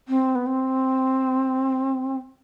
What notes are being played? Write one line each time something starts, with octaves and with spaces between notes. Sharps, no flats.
C4
B3
C4